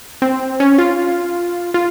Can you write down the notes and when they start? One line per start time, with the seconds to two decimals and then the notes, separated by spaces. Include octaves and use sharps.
0.22 C4
0.60 C#4
0.78 F4
1.74 F4